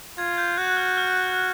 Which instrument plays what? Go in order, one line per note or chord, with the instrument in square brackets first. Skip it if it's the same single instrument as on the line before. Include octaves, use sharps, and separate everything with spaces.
[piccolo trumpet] F4 [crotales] G#6
[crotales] G6
[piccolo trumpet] F#4 [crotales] F#6
[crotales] F6
F6